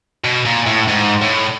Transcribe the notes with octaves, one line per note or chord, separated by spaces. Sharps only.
B2
A#2
A2
G#2
A2